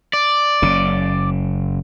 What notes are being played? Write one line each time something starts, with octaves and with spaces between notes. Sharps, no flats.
D5
F#1 C#3